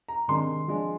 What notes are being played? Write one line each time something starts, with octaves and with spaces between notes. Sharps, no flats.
A#5
C3 D#3 G#3 D4 C6
F3 G#3 D4